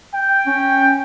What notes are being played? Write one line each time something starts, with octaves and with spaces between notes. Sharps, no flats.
G5
C#4